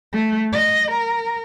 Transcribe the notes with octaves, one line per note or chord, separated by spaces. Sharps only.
A3
D#5
A#4